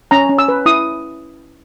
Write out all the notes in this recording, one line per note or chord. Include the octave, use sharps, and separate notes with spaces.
C#4 A#5
C#4
E6
B4
E4 D#6